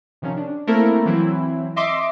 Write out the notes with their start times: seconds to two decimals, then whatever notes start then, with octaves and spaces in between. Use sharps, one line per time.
0.22 C3 D#3 F3 C#4
0.37 D4
0.67 A3 A#3 C4 E4 A4 A#4
1.05 E3 F#3 C4 E4
1.76 D#5 E5 C6 D6